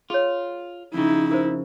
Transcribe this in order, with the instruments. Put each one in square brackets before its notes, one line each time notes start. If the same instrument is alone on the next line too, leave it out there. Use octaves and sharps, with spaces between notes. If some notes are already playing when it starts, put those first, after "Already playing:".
[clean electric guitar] F4 [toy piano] G#4 C#5
[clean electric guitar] F2 C#3 [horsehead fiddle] D#4 E4
[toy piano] A#4 C5